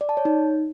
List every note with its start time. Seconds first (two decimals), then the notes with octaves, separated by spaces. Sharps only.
0.01 D5
0.09 A5
0.17 C#5
0.25 D#4